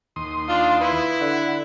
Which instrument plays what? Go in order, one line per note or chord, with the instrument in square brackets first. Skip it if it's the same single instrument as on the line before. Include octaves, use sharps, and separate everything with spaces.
[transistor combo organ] D#2 C6 D#6
[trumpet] D4 [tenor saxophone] F4
[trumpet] E4 [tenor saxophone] B4
[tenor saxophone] D3 [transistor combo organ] F#5